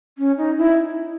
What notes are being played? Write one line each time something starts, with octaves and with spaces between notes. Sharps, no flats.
C#4
D#4
E4